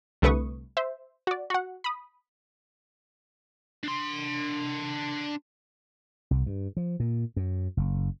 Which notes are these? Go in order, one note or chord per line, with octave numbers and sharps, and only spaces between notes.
C2 D3 A3 B4 C#6 D#6
C5 E5
F#4 D5
F#4 F#5
B5 D#6
D4 C6
C2
G2
F3
A#2
F#2
F#1